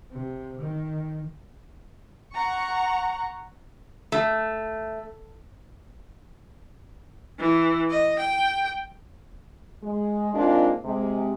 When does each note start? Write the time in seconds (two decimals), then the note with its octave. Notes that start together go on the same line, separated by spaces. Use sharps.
0.11 C3
0.59 D#3
2.32 F#5 A#5 C#6
4.12 A3
7.39 E3
7.90 D#5
8.19 G5
9.83 G#3
10.34 G#3 A#3 C4 D4 D#4 F4
10.85 C3 G#3